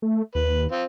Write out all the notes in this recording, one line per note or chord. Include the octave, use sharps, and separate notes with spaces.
A3
D#2 B4
C4 F4